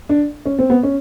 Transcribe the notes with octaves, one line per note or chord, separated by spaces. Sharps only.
D4
C#4
C4
B3
C#4